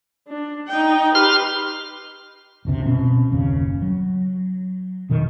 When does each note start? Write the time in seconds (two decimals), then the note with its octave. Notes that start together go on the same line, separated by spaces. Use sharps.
0.28 D4
0.68 D#4 G5
1.15 G4 B4 C6 F6
2.65 F#1 D2 C3
2.85 B2 C4 C#4
3.32 F#1 D#2 C#3
3.82 F#3
5.10 F1 B2 D#3